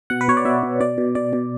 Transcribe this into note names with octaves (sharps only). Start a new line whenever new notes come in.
B2 F#5
B4
B2 C#5
D5
B2 E5
B2
B2 D5
B2
B2 D5
B2